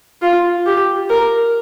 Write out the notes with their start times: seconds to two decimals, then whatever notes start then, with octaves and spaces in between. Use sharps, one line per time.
0.22 F4
0.66 G4
1.10 A#4